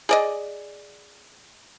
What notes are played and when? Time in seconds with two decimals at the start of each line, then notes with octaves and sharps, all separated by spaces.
0.09 G#4 D5 D#5